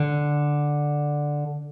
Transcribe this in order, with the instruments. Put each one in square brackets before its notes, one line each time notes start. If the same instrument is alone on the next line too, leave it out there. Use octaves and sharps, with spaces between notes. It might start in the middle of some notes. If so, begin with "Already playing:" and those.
Already playing: [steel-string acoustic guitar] D3